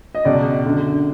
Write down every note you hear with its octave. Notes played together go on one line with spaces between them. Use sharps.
D#5
C#2 B2 D5
F#2 D3